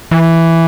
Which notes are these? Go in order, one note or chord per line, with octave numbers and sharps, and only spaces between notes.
E3